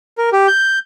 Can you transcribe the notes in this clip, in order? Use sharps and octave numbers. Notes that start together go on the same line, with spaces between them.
A#4
G4
G6